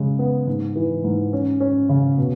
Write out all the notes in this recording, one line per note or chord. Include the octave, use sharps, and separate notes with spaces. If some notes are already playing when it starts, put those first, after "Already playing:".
Already playing: C#3 G#3
B3
G#2
E3
G#2
C#4
C#4
C#3
B2